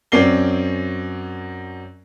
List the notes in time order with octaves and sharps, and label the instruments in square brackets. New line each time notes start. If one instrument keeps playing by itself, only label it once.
[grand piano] F#2 C4 C#4 D5 C7 G7